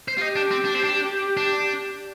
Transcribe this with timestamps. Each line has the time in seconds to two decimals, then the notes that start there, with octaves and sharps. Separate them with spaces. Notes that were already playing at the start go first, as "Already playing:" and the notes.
0.08 C5
0.18 F4
0.22 D#4 G4
0.36 D4
0.51 C4
0.65 D4
0.75 C4
0.84 D4
1.37 D4